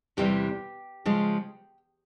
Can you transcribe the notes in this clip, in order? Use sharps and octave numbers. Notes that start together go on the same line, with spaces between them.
E2 C3 E3 G3 G4
C#3 F3 G#3